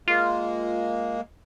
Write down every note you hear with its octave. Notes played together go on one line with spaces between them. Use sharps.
G#3 A#3 F4